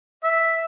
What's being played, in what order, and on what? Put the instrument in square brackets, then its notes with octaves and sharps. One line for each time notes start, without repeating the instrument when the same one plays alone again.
[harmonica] E5